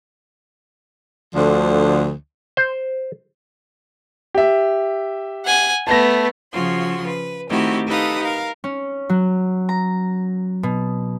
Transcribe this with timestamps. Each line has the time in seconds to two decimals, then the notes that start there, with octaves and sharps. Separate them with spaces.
1.34 D2 D3 F3
2.57 C5
4.34 G4 E5
5.45 F#5 G#5
5.87 A3 B3 A5 A#6
6.53 C#3 F3 F4 F#4 C6
7.06 B4
7.49 D#3 A3 C4 E4 F#4 G4
7.87 D#4 G4 A4 B4 F5 D#6
8.22 A#4 F5
8.64 C#4
9.09 F#3
9.69 A#5
10.63 B2